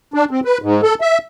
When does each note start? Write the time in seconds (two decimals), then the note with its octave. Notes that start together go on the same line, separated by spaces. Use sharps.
0.14 D4
0.31 C4
0.45 B4
0.62 G#2
0.83 A4
1.01 E5